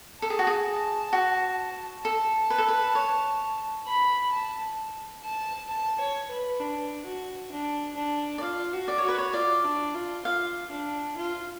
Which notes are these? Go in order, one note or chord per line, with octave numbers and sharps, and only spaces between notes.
A4 A5
G#4
F#4
G#4
F#4
A4 A5
B4
A4
B4
C#5
B5
A5
A5
A5
C#5
B4
D4
F#4
D4
D4
D5
F4 F5
F#4
D5
C#5
F#4
B4
C#5
F4 D5
D4
F4
F4 F5
D4
F4